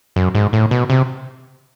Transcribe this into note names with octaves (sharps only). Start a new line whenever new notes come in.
F#2
G#2
A2
B2
C3